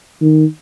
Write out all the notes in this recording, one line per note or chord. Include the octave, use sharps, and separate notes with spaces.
D#3